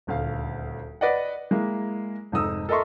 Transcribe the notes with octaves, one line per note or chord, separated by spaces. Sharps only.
D#1 D2 F5
B4 D5 D#5 F#5
G#3 A#3 E4
F1 G#2 D#4 D#6 E6
A4 A#4 D#5 E5 C6 C#6